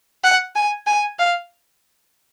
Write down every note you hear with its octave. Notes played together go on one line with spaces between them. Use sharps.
F#5
G#5
G#5
F5